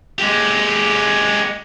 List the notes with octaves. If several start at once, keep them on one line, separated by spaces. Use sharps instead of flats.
G#3 G4